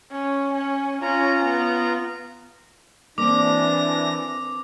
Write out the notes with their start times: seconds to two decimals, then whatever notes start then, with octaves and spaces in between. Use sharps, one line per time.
0.11 C#4
0.55 C#4
1.02 C#4 F4 A#5
1.44 B3
3.18 E3 A#3 C4 D4 D6 A#6